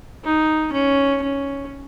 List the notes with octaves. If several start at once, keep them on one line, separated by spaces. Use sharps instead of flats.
D#4
C#4
C#4